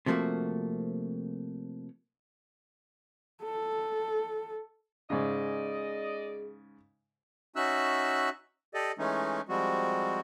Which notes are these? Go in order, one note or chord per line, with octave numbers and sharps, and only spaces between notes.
C3 F3 A3 A#3 F#4
A4
G#2 C#3 G#4 D5 D#5
C#4 D#4 F#4 E5 E6 F#6
G4 A4 D5 D#5
E3 G#3 A3 C#4 D#4
F3 G3 G#3 C4 F#4